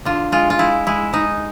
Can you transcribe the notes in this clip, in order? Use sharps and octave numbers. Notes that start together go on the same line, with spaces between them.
D3 F4
G#3 F4
F4
G#3 E4
G#3 E4
G#3 D#4